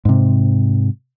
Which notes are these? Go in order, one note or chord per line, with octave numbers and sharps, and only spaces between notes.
G#2 C3